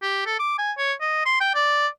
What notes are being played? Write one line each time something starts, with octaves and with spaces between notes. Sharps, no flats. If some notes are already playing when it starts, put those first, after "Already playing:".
G4
A4
D6
G#5
C#5
D#5
C6
G5
D5